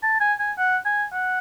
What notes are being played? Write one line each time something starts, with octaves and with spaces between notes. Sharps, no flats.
A5
G#5
G#5
F#5
G#5
F#5